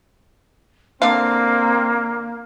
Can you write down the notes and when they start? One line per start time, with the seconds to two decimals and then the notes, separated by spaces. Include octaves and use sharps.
1.02 D3 A#3 C4 F5